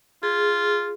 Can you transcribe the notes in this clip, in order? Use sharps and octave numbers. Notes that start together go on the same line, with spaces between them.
F4 G#4